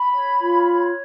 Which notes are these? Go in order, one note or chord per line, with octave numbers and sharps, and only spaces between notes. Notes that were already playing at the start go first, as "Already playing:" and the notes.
Already playing: B5
C#5
F4
C#5